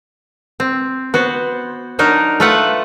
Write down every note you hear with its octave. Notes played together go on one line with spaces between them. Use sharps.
C4
B3 F#4 C5
F#3 D4 D#4 A#4
A3 F4 B4 E5 F#5